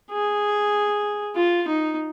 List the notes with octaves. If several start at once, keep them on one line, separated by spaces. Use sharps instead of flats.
G#4
F4
D#4